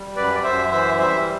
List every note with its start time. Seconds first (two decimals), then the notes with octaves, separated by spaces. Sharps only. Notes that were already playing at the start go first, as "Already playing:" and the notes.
Already playing: G3
0.16 F#2 B4 D5
0.43 F#2 C5 E5
0.70 E3 C5 E5
0.97 G3 C5 E5